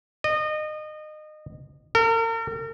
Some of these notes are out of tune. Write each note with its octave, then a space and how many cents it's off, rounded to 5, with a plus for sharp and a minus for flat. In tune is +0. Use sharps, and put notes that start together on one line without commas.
D#5 -25
A#4 -40